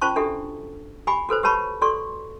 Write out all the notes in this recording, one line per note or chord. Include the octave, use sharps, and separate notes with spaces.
C#4 F4 C5 A5 C#6
D4 F#4 G4 A4 E5
G4 G#5 B5 D6
F#4 A4 B4 C5
G4 B4 C#5 A5 B5 C#6
F#4 A4 D5 C6 C#6